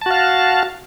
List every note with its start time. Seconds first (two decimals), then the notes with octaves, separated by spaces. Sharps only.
0.01 A5
0.06 F#4
0.10 F5